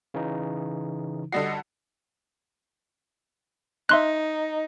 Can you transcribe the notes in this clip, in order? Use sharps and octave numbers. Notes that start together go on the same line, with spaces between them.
C#3 E3 D#4
D3 G3 F#4 D#5 C7
D#4 E5 C6 F#6